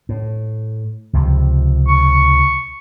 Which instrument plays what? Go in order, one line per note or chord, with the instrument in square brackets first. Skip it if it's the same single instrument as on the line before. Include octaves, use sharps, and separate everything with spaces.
[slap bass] A2
C#2 C3 F3
[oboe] C#6